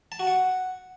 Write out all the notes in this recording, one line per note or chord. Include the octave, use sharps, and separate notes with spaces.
A5
F#4
F#5